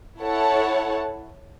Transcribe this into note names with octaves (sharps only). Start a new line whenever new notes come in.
E4 A4 C#5 F#5 A5